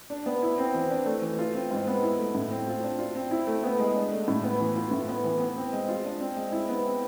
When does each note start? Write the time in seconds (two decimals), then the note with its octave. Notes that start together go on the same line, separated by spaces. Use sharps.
0.10 D4
0.26 B3
0.42 E4
0.58 C4
0.74 E3
0.90 D4
1.06 A3
1.22 E3
1.39 F4
1.54 C4
1.71 G#2
1.87 B3
2.03 E4
2.18 A3
2.35 A2
2.51 C4
2.67 F4
2.83 D4
2.99 F4
3.15 C4
3.31 E4
3.47 A3
3.64 B3
3.79 G#3
3.95 D4
4.12 A3
4.28 A2
4.44 B3
4.60 E3
4.76 F4
4.91 A2
5.08 B3
5.24 E3
5.40 B3
5.56 C4
5.72 G#3
5.89 F4
6.04 D4
6.21 C4
6.36 G#3
6.52 E4
6.69 B3
6.85 C4